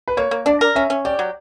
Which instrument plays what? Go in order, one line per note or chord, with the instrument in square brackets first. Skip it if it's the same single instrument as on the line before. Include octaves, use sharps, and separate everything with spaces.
[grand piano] B4
[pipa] A#3 [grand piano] C#5
[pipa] A#3
[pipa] D4 [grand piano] D5
[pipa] A#4
[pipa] C#4 [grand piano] E5
[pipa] C#4
[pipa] G4 [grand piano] D5
[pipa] F#3